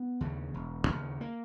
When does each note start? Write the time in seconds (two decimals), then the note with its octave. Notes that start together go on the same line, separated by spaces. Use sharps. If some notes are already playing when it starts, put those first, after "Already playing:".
Already playing: B3
0.21 D#2 C#3
0.54 E1
0.87 D#2 C#3
1.21 A#3